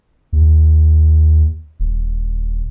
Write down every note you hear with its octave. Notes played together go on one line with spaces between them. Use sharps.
D#2
D#1